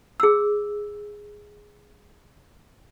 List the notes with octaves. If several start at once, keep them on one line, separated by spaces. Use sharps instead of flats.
G#4 E6